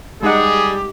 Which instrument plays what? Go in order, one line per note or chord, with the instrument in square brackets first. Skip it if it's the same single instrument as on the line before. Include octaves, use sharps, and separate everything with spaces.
[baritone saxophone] G3 [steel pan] G#3 D#4 F#5 [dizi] G4 [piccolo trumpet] G#4